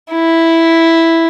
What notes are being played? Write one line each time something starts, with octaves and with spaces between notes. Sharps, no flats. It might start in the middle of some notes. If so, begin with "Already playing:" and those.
E4